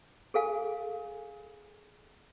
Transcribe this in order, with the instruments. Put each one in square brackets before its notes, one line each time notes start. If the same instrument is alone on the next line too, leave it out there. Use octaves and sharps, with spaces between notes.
[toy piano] G#4 A4 F5 G#5